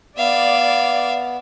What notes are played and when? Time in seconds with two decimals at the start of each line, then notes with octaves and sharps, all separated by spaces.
0.18 B3 D5 E5 F5